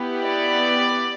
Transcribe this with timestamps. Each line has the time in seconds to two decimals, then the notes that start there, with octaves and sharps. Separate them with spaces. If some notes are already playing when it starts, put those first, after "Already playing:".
Already playing: B3 E4 G4
0.23 D5